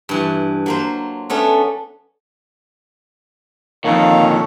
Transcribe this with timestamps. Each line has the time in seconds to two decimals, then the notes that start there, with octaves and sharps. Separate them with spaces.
0.09 G2 E3
0.66 F#3 A#3 C5
1.30 A3 B3 C#4 D4
3.85 F2 A#2 D#3 A4 C#5 F5 A#5